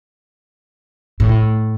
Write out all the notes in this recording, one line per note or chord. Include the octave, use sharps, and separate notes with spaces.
A2